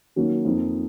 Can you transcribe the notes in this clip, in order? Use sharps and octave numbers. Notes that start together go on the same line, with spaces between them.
D#3 F#3 A#3 C#4 F#4
F2 F3 A#3 D#4